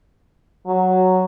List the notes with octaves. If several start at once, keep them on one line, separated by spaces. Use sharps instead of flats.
F#3